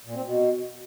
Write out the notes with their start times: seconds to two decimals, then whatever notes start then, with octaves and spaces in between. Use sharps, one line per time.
0.05 A#2
0.15 C4
0.25 B2